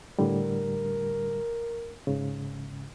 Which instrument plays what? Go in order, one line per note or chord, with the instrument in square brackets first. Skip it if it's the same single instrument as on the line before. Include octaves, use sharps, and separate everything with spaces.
[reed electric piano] A2 D3 G3 [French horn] A#4
[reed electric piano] G#2 C#3